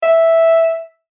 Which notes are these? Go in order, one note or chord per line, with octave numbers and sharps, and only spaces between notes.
E5